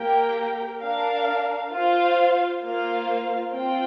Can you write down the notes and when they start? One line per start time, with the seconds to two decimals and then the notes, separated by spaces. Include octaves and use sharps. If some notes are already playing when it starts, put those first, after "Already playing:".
Already playing: A#3 G4 A#4 G5
0.82 D4 A#4 F5
1.71 F4 C5 F5
2.62 A#3 F4 C5 F5
3.52 C4 F4 C5 G5